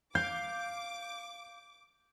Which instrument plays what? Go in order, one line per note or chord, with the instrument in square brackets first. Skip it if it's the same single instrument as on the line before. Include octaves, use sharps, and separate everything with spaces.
[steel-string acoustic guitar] F5 [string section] D6 [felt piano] G6